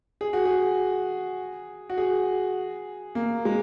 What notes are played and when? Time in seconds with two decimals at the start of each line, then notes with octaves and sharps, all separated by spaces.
0.21 G#4
0.33 F#4
0.45 G#4
1.90 F#4
1.98 G#4
3.15 A#3
3.45 G#3